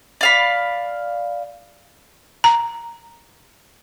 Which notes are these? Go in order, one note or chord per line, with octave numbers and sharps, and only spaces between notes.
D5 F5 B5
A#5